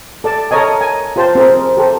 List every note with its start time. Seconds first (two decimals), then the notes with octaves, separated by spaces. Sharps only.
0.24 A4 D5 A5
0.51 A4 A#4 C#5 D#5 G#5
0.81 G#5
1.16 F4 G4 C5 A5
1.35 C4 G#4 A#4
1.77 G4 A4 C5